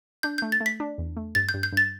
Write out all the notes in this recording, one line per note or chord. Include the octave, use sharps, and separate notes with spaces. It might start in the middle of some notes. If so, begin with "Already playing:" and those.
D4 G6
G6
A3
A6
A3
B6
D4
E2
A3
G2 A6
G6
G2
G6
G2 A6